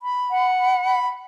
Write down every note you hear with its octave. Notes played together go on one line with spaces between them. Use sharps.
B5
F#5
B5
B5